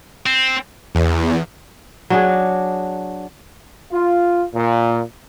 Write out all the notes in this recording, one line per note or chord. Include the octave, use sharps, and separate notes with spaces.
C4
E2
F#3 D4 G#4
F4
A#2